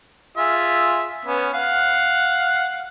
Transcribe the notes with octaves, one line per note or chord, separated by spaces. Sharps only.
F4 G#4 E5
B3 C#4
F5 F#5